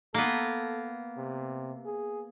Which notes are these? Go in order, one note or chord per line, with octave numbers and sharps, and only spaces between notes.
A#3 B3 A4
C3
G#4